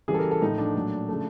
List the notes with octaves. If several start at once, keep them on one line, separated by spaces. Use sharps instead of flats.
C#3 E3 G3 G#4
A4
A#4
A4
A2 F3 A3 D#4
D4
A#2 F#3 A3
C#3 F3 A3